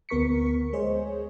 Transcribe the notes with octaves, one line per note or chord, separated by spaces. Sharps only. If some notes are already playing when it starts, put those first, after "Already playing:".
D2 B3 A#4 C#6 B6 C#7
G#3 G#4 C5 C#5 D#5